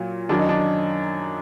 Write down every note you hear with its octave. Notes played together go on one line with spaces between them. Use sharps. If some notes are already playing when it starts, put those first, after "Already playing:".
Already playing: A#2 F#3
F#2 D#3 F#3 D4
D#4
D4